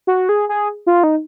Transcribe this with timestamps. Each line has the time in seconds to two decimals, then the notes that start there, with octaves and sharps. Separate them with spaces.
0.07 F#4
0.29 G#4
0.49 G#4
0.87 F4
1.03 D#4